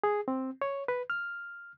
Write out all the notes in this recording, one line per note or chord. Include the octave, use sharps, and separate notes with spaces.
G#4
C4
C#5
B4
F6